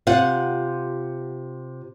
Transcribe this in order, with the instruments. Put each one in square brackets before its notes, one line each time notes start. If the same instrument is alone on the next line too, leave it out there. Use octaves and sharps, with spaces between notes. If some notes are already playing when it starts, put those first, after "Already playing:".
[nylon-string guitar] C3 F4 F#5